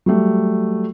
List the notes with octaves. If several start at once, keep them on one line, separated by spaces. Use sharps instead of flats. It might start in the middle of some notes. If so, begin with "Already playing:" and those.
F#3 G3 A3